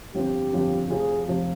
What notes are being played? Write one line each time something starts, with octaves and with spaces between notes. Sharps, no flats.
G1 F2 D3 F3 C4 G4
G1 F2 D3 F3 C4
F1 F2 C3 F3 G#4
F1 F2 C3 F3